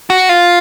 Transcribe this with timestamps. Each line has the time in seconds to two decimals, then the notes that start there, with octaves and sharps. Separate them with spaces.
0.10 F#4
0.29 F4